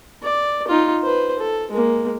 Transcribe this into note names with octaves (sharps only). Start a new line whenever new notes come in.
D5
D#4 F4
B4 C5
A4
G#3 A#3